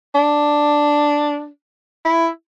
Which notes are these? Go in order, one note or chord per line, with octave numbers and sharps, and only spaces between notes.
D4
E4